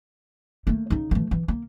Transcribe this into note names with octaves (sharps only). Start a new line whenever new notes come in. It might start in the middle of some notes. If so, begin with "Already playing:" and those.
A3 A#3
C#3 D#4
E3 A3
E3
A#3